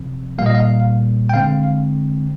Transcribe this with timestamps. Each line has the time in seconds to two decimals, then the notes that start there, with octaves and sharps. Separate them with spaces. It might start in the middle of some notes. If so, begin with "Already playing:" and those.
Already playing: C3 F3 C4
0.38 A#2 G3 A#3 F5
0.46 D#5
0.55 F5
1.29 G5
1.34 D3 G#3 C4 F5